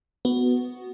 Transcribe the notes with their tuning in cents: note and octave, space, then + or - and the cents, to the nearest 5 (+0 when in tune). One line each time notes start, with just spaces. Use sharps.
B3 +5 F#4 +0